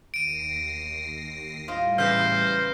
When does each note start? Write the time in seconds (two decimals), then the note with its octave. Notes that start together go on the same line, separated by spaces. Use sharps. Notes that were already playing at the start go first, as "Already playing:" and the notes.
0.14 D#2 A#6 C7 D7 D#7
1.68 A2 G3 F4 C5 D#5
1.98 C#3 E3 B3 C5 F6 G6 A#6